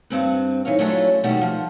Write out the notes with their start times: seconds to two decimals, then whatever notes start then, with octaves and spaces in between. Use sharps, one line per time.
0.10 G2 C4 B4
0.65 E3 D#4 C#5 F5
0.79 F#3 A3 C#4 D4 E4 F4
1.24 B2 D#3 G3 A3 F#4
1.41 F3